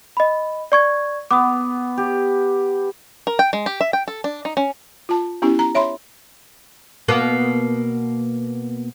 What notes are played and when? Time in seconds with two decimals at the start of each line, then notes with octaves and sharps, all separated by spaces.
0.17 D#5 B5
0.72 D5 C#6 G#6
1.31 B3 D6 D#6
1.97 G4
3.27 A#4
3.39 G5
3.53 G#3
3.66 G4
3.81 E5
3.93 G5
4.08 A4
4.24 D4
4.45 D#4
4.57 C#4
5.09 F4 A5
5.42 B3 C#4 E4 G4
5.59 A#5
5.75 C#5 E5 B5 C6
7.08 B2 A#3 B3